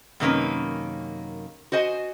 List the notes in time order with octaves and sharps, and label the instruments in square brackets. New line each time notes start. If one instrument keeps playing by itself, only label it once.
[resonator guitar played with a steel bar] F#2 C3 D#3 A#3 C#4 B4
F#4 C5 D#5 G#5